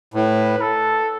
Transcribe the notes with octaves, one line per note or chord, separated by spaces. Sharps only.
A2 B4
A4